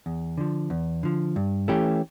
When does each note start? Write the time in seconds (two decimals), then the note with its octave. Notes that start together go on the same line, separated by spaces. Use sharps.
0.06 E2
0.38 D3 F3
0.70 E2
1.03 D3 F3
1.36 G2
1.68 E3 A3 C#4 G4